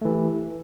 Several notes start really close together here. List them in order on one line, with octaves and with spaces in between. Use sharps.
A3 E3 G4